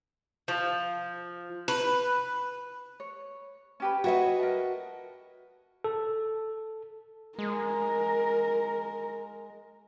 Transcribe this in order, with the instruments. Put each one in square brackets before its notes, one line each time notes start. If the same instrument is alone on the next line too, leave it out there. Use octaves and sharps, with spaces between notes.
[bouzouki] F3
B4
[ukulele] C#5
C#4 G4 B4
[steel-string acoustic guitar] F#4 B4 D#5 [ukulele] A4 C#5 E5
[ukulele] A#4 A5
[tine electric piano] A4
[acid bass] G#3 [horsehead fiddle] A#4